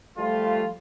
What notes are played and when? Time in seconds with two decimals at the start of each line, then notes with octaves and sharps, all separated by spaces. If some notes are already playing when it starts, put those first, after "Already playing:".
0.18 F3 G3 A3 F4